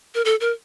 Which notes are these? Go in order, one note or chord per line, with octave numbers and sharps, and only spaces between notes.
A#4
A4
A#4